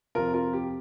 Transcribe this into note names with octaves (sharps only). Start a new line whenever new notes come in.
F2 C3 F4 A#4
F4 A#4
G4